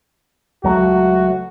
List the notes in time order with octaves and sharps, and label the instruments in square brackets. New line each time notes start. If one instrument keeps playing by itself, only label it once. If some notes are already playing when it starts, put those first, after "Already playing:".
[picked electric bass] C#2 F#3 A3 [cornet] F#4